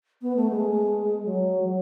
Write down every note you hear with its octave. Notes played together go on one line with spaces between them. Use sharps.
B3
A3
G#3
F#3
F#3